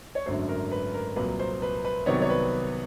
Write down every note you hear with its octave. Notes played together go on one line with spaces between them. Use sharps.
C#5
G#1 F#2 D3 F#3 A3 C5
A#4
B4
A#4
C2 A#2 F#3 A#3 B4
C5
B4
B4
C2 C3 D#3 F#3 B3 C#5
D5
C#5
B4